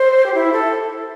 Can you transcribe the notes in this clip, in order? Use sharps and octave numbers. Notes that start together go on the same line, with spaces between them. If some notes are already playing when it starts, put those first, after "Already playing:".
Already playing: C5
G4
E4
A4